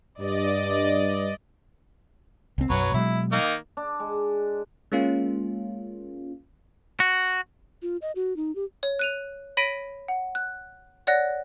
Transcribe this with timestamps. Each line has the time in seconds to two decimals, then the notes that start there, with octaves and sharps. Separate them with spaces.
0.20 G2 D5 D#5
2.58 C2 C4
2.70 B1 F#2 F#3 B4 C#5
2.94 B2 F#3 G#3 E4
3.32 D#3 A#3 D#4
3.77 D4
4.00 G#3
4.92 G#3 A#3 C#4 F4
7.00 F#4
7.82 F4
8.02 D#5
8.15 F#4
8.37 D#4
8.55 G4
8.83 C#5
8.99 F#6 D#7 F7
9.57 C#5 B5 A#6 B6 D7 D#7
10.08 F#5
10.35 F#6
11.07 C#5 D5 F#5 F#6 A#6